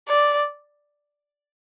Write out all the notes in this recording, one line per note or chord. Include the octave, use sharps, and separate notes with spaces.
D5